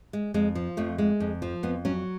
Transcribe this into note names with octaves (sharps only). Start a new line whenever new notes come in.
G#3
F2 G#3
F3
F2 A3
G#3
F2
F3
F2 B3
F#3 C#4